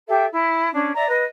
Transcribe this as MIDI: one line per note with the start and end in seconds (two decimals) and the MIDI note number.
0.07 0.25 67
0.07 0.25 69
0.07 0.25 76
0.32 0.71 64
0.72 0.94 61
0.72 0.94 62
0.94 1.06 74
0.94 1.06 76
0.94 1.06 82
1.08 1.24 71
1.08 1.24 75